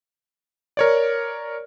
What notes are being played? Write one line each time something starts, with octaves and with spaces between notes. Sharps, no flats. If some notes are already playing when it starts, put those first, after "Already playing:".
A#4 C#5 D5